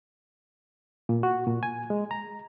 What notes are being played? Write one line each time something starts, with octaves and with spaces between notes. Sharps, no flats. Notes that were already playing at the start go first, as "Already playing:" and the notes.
A#2
F#4
A#2
G#5
G#3
A#5